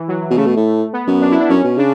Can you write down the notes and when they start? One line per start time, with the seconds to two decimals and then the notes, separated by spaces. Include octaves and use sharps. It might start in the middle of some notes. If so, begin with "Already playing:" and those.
Already playing: E3
0.08 F#3
0.30 B2
0.36 C#3 A3
0.46 B2
0.56 A2
0.93 B3
1.07 F#2
1.21 D4
1.31 E4
1.40 D4
1.49 F#2 C#4
1.64 B2
1.77 C#3 D4